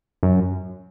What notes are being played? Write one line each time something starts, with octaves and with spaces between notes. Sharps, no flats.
F#2